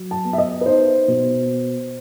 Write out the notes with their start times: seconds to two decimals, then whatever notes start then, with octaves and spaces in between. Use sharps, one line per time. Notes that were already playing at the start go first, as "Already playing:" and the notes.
Already playing: F#3
0.11 A5
0.24 B3
0.33 E5
0.38 D#5
0.61 B4
0.66 D#4 C5
1.08 B2